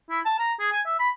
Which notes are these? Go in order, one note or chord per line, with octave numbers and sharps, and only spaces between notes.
E4
A5
A#5
G#4
G#5
E5
B5